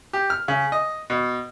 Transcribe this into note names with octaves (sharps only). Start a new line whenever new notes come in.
G4
F6
C#3
D#5
B2